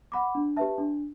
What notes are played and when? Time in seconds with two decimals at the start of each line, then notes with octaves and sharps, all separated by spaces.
0.12 F#5 B5 D6
0.35 D4
0.57 G4 B4 E5 A5
0.78 D4